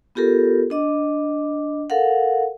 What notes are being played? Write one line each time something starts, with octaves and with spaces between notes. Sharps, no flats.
B3 F4 G4 A4 A#4
D4 D#5 D6
A4 A#4 F5 F#5